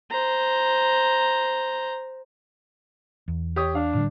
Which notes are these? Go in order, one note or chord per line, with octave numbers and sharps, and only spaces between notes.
C5 A#5
E2
G4 C#5 D#6
D4 F5
A2 D3 G3